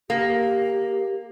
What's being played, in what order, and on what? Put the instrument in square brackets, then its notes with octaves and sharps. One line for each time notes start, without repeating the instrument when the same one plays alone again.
[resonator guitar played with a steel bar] A#3 [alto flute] G4